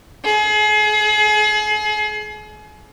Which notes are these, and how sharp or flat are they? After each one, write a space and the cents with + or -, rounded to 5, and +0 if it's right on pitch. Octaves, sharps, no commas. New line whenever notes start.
G#4 +35